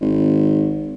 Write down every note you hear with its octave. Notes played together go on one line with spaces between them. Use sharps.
G#1